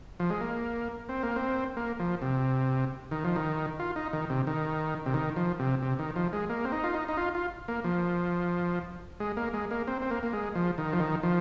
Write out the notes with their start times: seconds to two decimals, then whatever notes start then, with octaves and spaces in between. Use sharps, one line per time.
0.20 F3
0.30 G#3
0.41 A#3
1.09 C4
1.23 A#3
1.36 C4
1.77 A#3
2.00 F3
2.22 C3
3.11 D#3
3.24 F3
3.36 D#3
3.80 F4
3.96 D#4
4.13 D#3
4.30 C3
4.47 D#3
5.06 C3
5.14 D#3
5.36 F3
5.59 C3
5.82 C3
5.99 D#3
6.16 F3
6.33 G#3
6.50 A#3
6.65 C4
6.72 D#4
6.84 F4
6.94 D#4
7.08 D#4
7.17 F4
7.35 F4
7.68 A#3
7.84 F3
9.20 G#3
9.37 A#3
9.54 G#3
9.71 A#3
9.88 C4
10.02 C4
10.11 A#3
10.23 A#3
10.33 G#3
10.55 F3
10.78 D#3
10.93 F3
11.00 D#3
11.23 F3